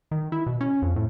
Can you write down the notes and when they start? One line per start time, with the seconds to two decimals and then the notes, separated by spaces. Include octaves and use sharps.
0.11 D#3
0.32 E4
0.47 B2
0.61 C#4
0.82 F2
0.96 A2